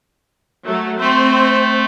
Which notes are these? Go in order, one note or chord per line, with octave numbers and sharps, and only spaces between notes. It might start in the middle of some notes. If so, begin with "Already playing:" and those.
F#3 A3
A3 C4 C5